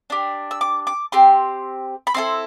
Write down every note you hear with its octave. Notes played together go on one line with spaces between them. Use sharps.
D4 G4
E6
D6
D6
C4 G4 C6
B5
C4 E4 A4 C6